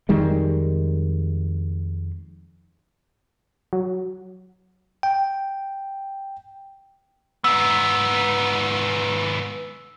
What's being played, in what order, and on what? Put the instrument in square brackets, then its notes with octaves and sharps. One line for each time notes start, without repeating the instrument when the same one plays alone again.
[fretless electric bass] F2 D#3 G3 G#3
[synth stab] F#3
[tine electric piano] G5
[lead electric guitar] G#2 B3 [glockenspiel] E6